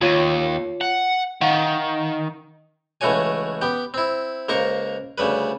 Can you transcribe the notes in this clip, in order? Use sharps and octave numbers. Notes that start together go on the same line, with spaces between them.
D#2 F4 C#5
F#5
D#3 F5 F#5
C#2 E3 A3 F#4 C#5 G#5
B3 G4 G5
C4 E4
C#2 A#3 A#4 C5 C#6
D2 C#3 G3 B4